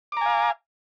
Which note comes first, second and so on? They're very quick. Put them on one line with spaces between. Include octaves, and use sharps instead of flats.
D6 A#5 G#5 F5